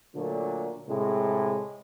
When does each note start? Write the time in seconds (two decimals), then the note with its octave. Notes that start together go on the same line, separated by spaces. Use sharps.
0.15 A#2 D3 F#3 A3
0.89 A2 C3 G#3